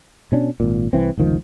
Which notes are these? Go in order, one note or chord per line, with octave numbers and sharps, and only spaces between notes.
B2 C#4 D4
G#1 A#2
C2 E3 C4
F1 C#2 D#3 F3